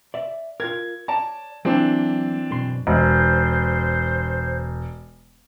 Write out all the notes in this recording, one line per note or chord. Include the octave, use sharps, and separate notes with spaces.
D5 E5
F4 A#4 G#6
C#5 D5 A5 A#5
E3 F#3 A#3 C4 D4
F#2 B2 C6
E1 C5